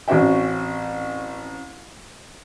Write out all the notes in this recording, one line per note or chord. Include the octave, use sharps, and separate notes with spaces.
A1 C4 C#4 F#4 E5 G5